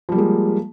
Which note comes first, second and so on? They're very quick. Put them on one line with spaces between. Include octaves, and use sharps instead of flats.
F3 G3 A#3 G#3